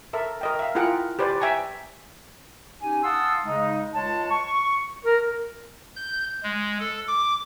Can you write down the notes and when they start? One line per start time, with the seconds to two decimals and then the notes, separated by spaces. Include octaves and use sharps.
0.13 A4 A#4 E5
0.41 A#4 D#5 G5
0.59 E5 F5
0.75 E4 F4 G#4 A#4 F#5 G5
1.19 G4 B4 C5 D5
1.40 E5 G5 G#5 A#5 C#6
2.81 C#4 D#4 G4 G#5
3.03 F5 F#5 A5 C6 D#6 E6
3.44 C#3 G#3 D#4
3.94 C#2 G#3 C#5 A5
4.30 C#6
5.04 A#4
5.96 G6
6.43 G#3
6.79 A4
7.08 D6